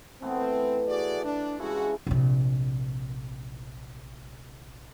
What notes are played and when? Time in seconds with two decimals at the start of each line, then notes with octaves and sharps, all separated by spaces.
0.22 E3 A3 B3 C4
0.88 F#4 G#4 D5
1.24 D4
1.59 G2 C#3 G#3 E4 F#4
2.07 A#1 C3